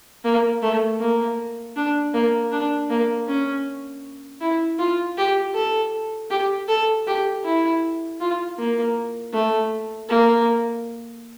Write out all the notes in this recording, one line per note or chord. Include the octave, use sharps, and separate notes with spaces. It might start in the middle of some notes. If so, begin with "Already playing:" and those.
A#3
A3
A#3
D4
A#3
D4
A#3
C#4
E4
F4
G4
A4
G4
A4
G4
E4
F4
A#3
A3
A#3